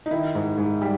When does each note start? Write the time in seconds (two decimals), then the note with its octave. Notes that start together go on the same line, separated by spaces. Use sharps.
0.06 D#4
0.11 D#3 E4
0.35 G#2
0.57 G#2
0.82 G3